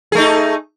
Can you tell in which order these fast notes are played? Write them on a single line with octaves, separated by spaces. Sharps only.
G#4 A3 D#4